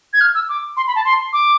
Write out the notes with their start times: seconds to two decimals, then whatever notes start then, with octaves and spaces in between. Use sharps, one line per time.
0.13 G#6
0.21 F6
0.35 E6
0.49 D6
0.77 C6
0.87 B5
0.96 A5
1.05 C6
1.33 D6